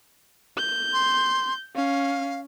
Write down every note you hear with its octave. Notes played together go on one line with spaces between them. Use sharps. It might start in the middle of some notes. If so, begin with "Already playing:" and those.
G6
C6
C#4 F5